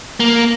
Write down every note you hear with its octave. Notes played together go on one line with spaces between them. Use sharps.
A#3